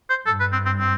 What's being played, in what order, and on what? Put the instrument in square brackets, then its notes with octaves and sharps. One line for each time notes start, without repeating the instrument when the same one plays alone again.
[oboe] C5
[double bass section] G2 [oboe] A4
[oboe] B4
C4
C4
C4